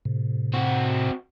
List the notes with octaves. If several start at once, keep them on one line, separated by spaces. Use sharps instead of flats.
A2 C3
C4 F#4